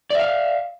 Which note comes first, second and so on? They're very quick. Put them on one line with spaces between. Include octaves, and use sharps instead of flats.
D5 E5 F5